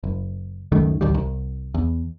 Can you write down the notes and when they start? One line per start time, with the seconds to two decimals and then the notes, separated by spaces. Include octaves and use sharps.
0.04 F#1
0.72 C#2 F#2 D#3 A3
1.01 A1 D2 D#3 G3
1.14 C2
1.74 E2